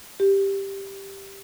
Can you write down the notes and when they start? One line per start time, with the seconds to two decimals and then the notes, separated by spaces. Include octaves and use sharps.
0.20 G4